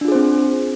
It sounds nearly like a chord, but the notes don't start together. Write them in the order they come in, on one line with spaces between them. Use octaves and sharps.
D4 F4 G#4 C5 C4